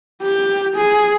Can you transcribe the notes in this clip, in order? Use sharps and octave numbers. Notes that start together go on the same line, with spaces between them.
G4
G#4